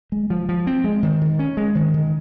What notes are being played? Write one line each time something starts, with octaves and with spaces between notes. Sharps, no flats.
G#3
F3
F3
C4
G#3
D#3
D#3
C#4
G#3
D#3
D#3